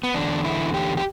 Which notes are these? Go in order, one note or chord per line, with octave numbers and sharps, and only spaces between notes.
B3
E2 D3 D4
E4
G4
G4